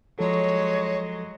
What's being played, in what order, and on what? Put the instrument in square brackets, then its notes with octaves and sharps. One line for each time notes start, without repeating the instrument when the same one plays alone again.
[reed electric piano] F3 A4 [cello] F#3 G#3 [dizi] C#5